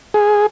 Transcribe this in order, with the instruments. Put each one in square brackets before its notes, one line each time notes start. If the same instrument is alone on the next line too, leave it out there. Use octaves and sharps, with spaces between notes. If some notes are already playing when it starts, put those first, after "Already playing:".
[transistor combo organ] G#4